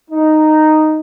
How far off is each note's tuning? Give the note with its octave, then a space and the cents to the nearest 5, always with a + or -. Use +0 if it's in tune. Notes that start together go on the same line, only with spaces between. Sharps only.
D#4 -5